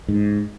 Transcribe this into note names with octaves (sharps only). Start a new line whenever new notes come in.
G#2